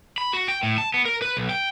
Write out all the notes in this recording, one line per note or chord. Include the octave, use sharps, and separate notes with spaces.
B5
F#4
G5
A2
A5
B3
A#4
B4
B1
G5